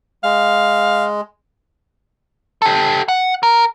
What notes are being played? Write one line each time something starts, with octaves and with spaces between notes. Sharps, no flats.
G#3 F5
G4 A4
F#5
A#4